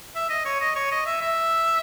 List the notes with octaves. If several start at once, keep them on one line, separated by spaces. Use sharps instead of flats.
E5
D#5
C#5
D#5
C#5
D#5
E5
E5